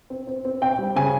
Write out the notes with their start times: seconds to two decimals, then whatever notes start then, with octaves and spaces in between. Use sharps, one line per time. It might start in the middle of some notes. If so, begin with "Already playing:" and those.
0.10 C4
0.27 C4
0.45 C4
0.62 C4 G5
0.79 G3
0.96 C#3 G#5